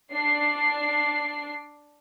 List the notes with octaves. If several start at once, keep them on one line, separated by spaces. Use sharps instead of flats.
D4 C7